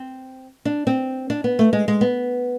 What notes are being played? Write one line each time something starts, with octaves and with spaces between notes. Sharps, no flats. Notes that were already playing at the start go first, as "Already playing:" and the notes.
Already playing: C4
D4
C4
D4
B3
A3
G#3
G#3
B3